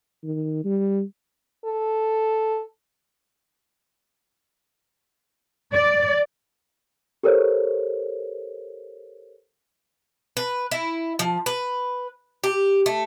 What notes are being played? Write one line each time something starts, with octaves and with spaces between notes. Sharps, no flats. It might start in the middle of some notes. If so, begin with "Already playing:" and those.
D#3
G3
A4
D5
G4 A4 A#4 C5 C#5
B4
E4
F3
B4
G4
A3